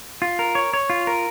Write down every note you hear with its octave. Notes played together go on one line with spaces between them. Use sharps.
F4
A#4
C#5
C#5
F4
A#4